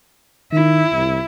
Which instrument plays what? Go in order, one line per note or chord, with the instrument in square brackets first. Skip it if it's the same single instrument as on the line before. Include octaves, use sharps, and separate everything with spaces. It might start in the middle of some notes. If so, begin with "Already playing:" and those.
[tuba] D#3 [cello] E4
[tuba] C2